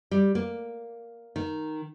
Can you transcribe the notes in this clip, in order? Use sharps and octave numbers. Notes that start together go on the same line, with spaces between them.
G3
A#3
D#3